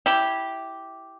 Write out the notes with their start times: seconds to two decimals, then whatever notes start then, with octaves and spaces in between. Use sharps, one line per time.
0.06 E4 G4